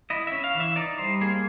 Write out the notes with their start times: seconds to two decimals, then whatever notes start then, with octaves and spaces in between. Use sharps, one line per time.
0.10 E4 D#5
0.27 C#4 E5
0.44 F5
0.55 E3
0.60 E5
0.76 D#4 D5
0.98 G3 C5
1.21 A#3 G#4